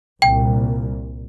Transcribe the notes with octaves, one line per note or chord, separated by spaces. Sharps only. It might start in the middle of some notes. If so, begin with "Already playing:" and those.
C2 A#2 G5